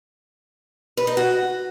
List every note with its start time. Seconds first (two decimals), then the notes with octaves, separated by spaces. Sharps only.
0.97 B4
1.07 D#4
1.17 F#4